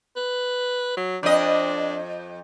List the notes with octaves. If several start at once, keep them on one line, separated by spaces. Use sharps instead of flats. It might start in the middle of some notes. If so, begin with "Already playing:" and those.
B4
F#3
F2 D4 D#5